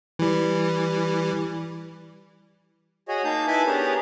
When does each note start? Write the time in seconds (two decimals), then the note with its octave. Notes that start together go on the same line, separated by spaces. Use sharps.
0.19 E3 G3
3.08 F#4 G#4 C#5 D#5
3.25 A#3 D#4 A5 G6
3.47 E4 B4 E5 G#5 A5 B5
3.67 B3 D4 G4 G#4 A#4 C#5